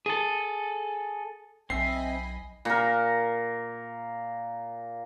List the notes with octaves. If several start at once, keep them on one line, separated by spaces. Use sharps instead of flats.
G#4 A4
B1 C4 D#5 E5 G#5 B5 C7
A#2 A#4